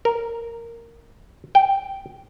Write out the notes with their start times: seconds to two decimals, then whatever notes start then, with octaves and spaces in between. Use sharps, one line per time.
0.05 A#4
1.55 G5